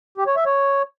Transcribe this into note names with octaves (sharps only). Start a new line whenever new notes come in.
G4
C#5
E5
C#5